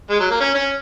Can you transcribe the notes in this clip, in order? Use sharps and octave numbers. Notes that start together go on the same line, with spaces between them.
G#3
F#3
A#3
C#4
C#4